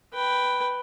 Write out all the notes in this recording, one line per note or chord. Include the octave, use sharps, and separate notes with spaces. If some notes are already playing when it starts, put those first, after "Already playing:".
B4 G5